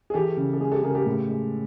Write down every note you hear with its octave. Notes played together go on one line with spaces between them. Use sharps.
G#4
E3 G4 A4
C#3
A4
G#3 G#4
G4 A4
C#3 G#4 A#4
G4 A4
A2
G#3